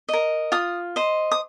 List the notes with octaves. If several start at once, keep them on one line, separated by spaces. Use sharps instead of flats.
A#4 D#5
F4 D#6
C5 D#5
D#6